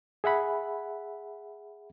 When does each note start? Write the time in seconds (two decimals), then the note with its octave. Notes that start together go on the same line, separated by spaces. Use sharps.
0.24 G#4 E5 F#5 B5